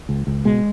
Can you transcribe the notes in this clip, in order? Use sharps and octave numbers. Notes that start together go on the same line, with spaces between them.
C#2
C#2
B2 G#3